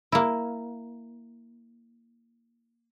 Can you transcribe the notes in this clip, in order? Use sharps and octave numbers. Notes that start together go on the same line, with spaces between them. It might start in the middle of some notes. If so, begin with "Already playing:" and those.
A#3 E4